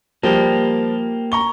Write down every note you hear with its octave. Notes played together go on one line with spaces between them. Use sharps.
F3 G3 A#3 G4
A#5 C#6 G7